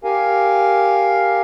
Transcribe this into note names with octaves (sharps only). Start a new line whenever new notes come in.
G4 A#4 F5 G#5